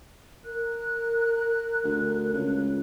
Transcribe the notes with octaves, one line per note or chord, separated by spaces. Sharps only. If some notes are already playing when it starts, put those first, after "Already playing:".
A#4 F#6
D2
C#2